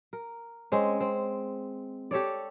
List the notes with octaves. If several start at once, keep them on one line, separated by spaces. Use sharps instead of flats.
A#4
G#3 C4 C#4
C4
G4 A4 C#5 D5